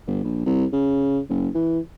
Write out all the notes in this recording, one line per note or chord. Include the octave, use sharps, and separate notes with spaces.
G1
A#1
C2
C#3
F#1
E3